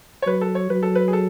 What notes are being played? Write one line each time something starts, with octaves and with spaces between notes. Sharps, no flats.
C#5
F#3 B4
A4
C#5
F#3 B4
A4
B4
G#4
A4